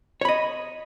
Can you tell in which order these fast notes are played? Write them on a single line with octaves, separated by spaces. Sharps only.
C#5 B5 D#5